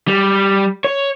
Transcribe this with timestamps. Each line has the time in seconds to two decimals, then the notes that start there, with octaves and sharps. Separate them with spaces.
0.08 G3
0.84 C#5